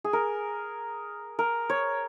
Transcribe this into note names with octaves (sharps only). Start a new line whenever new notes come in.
G#4
A#4
A#4
C#5